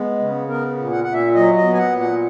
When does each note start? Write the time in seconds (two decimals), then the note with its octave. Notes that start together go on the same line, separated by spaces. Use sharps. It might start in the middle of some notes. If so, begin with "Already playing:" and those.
Already playing: G#3 B3
0.19 C#3
0.48 B3 A#4
0.77 A#2
0.92 F#5
1.04 A#2 F#5
1.13 E5
1.35 F#3 D#5
1.57 D#5
1.64 B3
1.73 G#5
1.78 F#5
1.92 A#2
2.00 F#5